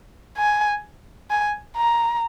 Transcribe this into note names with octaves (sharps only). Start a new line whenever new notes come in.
G#5
G#5
A#5